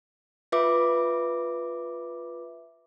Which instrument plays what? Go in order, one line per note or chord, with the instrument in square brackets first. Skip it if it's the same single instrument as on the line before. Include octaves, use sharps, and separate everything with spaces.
[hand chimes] F4 B4 E5 D6